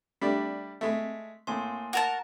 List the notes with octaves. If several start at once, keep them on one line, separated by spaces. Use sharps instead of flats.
G3 A3 D4
G#3 A3 B6
A2 A#3 G#5 C6
F#4 A#4 A5